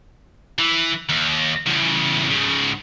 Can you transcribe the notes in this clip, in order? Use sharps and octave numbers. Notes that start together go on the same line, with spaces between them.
E3
D#2
E2 C#3
G#2 C#3